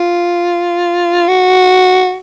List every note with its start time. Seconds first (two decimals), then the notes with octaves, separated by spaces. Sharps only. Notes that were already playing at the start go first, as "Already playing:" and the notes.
Already playing: F4
1.28 F#4